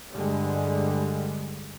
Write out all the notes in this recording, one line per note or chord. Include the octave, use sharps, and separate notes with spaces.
G2 D3 G3 G#3